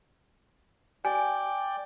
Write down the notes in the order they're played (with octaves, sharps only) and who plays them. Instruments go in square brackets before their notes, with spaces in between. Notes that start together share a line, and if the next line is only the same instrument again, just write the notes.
[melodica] D5 G5 [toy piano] G#5